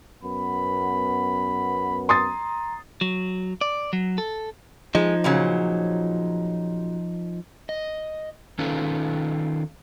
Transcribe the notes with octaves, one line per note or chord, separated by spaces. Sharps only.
F#2 B3 B5
A#5 C6 D#6 A6
F#3
D5
F#3
A4
F3 G#3 D#4
A#2 C#3 F#3
D#5
D#3 C#4 D#4 F4 A4 B4